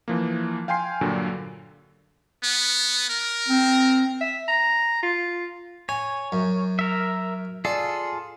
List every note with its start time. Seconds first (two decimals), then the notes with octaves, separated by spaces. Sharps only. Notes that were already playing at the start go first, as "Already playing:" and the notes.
0.08 E3 F3 A#3
0.68 F5 G5 G#5 C6 C7
1.01 G2 A#2 D3 F#3
2.43 B3
3.09 A#4
3.48 C4
4.21 E5
4.48 A#5
5.03 F4
5.89 C#5 G#5
6.32 F#2
6.79 A#4 E5
7.65 F4 G#4 A4 D5